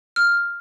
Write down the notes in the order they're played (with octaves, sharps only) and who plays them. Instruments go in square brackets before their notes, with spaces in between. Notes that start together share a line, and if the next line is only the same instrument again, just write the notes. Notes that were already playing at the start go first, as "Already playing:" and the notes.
[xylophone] F6